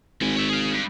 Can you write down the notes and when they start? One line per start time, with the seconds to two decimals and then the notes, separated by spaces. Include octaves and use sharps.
0.21 G#1 F3 G#5
0.36 C#5 E5
0.49 G#4 F5
0.72 G2